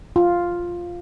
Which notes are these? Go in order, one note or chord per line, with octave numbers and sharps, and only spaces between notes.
F4